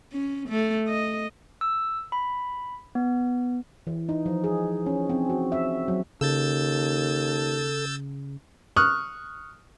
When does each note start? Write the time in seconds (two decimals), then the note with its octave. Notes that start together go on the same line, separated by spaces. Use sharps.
0.13 C#4
0.49 A3
0.89 D#5
1.61 E6
2.12 B5
2.95 B3
3.87 E3
4.09 D#4
4.26 F3
4.44 G#4
4.86 C#4
5.10 C4
5.30 F#4
5.52 E5
5.88 F#3
6.21 D#2 C#3 A4 E6 G6 A6
8.76 C#6 D#6 F6 F#6